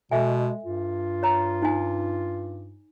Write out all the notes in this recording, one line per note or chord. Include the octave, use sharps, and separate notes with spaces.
B2 G#3 A4 E5 G#5
G2 F4
C#5 A#5
D#4 G#5